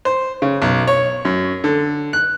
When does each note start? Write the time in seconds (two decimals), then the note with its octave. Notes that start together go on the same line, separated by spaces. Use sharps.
0.05 C5
0.42 C#3
0.62 B1
0.87 C#5
1.25 F#2
1.64 D3
2.13 F#6